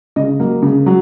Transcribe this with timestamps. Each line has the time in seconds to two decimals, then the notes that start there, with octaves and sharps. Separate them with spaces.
0.16 C#3 D#5
0.40 F#3 A#3
0.62 C#3
0.86 F#3